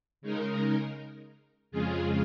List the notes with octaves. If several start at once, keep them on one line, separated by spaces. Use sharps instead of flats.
C#3 G#3 D#4 A#4
F2 C#3 G#3 F4 G#4